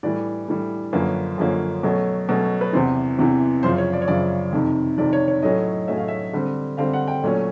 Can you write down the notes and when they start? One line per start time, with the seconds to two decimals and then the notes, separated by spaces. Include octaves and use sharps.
0.03 A2 E3 G3 D5
0.48 A2 E3 G3
0.93 F#2 D3 F3 A#3 C#4 B4
1.38 F#2 D3 F3 A#3 C#4
1.83 B2 F#3 A3 C#4
2.29 B2 F#3 A3 C#4
2.61 B4
2.73 E2 C3 E3 C5
3.19 E2 C3 E3
3.63 F#2 C#3 F3 C5
3.78 C#5
3.93 D5
4.02 C#5
4.08 F#2 C#3 F3 D5
4.53 F2 C3 D#3
4.98 F2 C3 D#3 D5
5.13 C#5
5.28 C#5
5.43 A2 F#3 A3 C#4 D#5
5.88 A2 F#3 A3 C#4 E5
5.97 F5
6.08 E5
6.33 D3 G3 C4
6.77 D3 G3 C4 F5
6.93 F#5
7.08 G5
7.24 A#2 F#3 A3 C#4